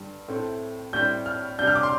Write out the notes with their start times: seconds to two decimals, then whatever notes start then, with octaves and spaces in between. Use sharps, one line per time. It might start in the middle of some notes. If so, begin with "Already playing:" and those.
Already playing: G2 D3 G3
0.28 A2 A3 C4
0.93 A2 G3 C4 G6
1.26 F6
1.58 C3 G3 D4 G6
1.67 F6
1.75 D6
1.83 C6